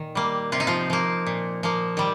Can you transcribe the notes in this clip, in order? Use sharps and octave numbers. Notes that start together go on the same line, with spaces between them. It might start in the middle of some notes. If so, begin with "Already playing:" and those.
Already playing: A#2 D#3
G3 A#3
C3 F4
D#4
F3 F4
F3 A#3
A#2
F3 A#3
D#3 G3